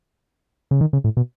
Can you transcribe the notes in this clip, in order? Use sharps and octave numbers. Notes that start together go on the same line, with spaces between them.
C#3
D#3
C#3
A2
B2